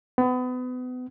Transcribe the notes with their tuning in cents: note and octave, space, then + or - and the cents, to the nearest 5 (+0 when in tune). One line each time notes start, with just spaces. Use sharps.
B3 +30